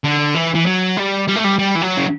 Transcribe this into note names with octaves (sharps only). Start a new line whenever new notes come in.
D3
E3
E3
F#3
G3
G3
A3
G3
G3
E3
F#3
C#3